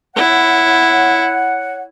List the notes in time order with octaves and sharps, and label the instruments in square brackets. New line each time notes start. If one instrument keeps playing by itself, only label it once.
[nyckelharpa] E4 [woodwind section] C#5 F#5